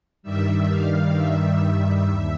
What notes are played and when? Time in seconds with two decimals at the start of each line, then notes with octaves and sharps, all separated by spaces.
0.23 G2 D#3 G3 E5
0.68 F5
1.15 E5
2.07 D#2